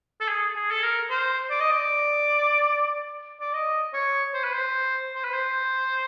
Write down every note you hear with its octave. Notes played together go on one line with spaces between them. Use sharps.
A4
G#4
G#4
A4
A#4
C5
D5
D#5
D5
D5
D#5
C#5
C5
B4
C5
C5
B4
C5